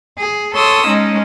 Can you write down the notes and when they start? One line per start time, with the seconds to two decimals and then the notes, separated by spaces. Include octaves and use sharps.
0.17 G#4
0.54 A4 C#5 C6 D#6 E6
0.87 G#3 C#4 D#4